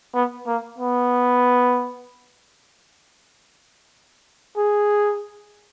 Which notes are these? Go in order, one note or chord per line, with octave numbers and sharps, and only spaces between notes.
B3
A#3
B3
G#4